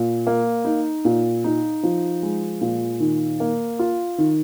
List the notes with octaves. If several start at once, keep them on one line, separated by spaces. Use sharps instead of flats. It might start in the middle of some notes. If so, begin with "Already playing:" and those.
Already playing: A#2
A#3
D#4
A#2
D#4
F3
G#3
A#2
D#3
A#3
F4
D#3